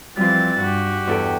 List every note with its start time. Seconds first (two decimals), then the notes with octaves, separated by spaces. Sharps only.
0.17 E3 F3 G3 C4 F4 A6
0.60 G2 F#4 G4
1.07 E2 A4 G5